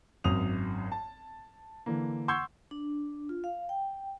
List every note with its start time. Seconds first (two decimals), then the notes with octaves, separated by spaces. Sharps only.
0.24 G#1 F#2 D#6 F7
0.92 A5
1.86 D3 E3 A#3
2.28 F#5 C6 C#6 E6 G6 G#6
2.71 D4
3.29 F4
3.44 F5
3.69 G5